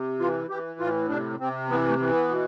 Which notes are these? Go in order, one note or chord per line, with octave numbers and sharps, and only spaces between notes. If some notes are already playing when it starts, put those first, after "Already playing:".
Already playing: C3
E3 F4
E3 G4
A2 F4
C3 D4
C3 C4
E3 B3
A3
E3
B3
B2